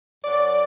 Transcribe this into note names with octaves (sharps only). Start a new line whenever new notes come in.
F#2 F#3 D5